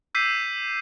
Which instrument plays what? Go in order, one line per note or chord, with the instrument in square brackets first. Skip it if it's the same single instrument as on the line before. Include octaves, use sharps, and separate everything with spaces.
[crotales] D6 E6 G6 B6 C7 D#7